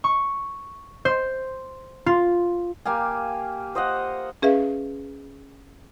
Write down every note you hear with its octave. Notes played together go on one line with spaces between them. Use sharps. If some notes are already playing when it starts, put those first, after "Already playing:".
C#6
C5
F4
A#3 G4 F5 G#5
C5 D#5 F5 F#5
C#4 G#4 B4 E5 F5